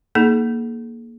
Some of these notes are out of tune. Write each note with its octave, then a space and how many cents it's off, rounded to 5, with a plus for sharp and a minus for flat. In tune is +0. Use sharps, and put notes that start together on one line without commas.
A#3 +0 D#4 +0 G#4 +45